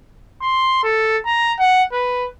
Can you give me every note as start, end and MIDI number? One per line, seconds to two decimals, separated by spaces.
0.41 0.79 84
0.83 1.18 69
1.25 1.53 82
1.59 1.83 78
1.92 2.26 71